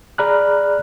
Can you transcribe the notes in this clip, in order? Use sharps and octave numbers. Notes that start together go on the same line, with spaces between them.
G#4 D5 A#5 B5 F6 F#6